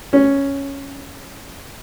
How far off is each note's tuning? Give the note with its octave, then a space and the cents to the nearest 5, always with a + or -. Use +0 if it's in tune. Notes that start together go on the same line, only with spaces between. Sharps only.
C#4 +0 C#5 +0